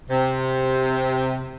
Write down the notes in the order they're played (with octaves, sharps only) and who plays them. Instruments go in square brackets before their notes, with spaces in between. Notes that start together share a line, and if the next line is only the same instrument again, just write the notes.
[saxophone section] C3